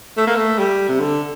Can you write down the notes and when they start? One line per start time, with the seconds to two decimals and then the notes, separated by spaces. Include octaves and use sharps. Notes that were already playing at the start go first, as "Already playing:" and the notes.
0.17 A3
0.27 A#3
0.36 A3
0.59 G3
0.89 C3
1.00 D3